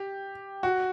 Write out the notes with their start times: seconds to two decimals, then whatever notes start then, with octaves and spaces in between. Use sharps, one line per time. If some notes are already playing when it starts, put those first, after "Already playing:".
Already playing: G4
0.63 F#4